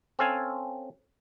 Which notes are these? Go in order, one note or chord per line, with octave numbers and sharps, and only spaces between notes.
C4 C#4 A4 F5 G#5